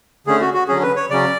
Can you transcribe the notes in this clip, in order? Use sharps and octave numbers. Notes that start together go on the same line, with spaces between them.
D3 A3 C#4 G#4
F#4
F#4
D3 F#3 C#4 G#4
B4
C#5
C#3 F#3 C#4 D5